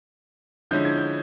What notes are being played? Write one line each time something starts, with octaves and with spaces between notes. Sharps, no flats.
D3 F3 G#3 C#4 E4 G6
G#6
G6